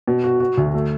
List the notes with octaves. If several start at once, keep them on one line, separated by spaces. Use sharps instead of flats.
B2
F#4
F#4
D2
A3